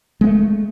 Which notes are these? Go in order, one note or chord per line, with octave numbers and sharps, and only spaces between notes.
G#3 A3 B3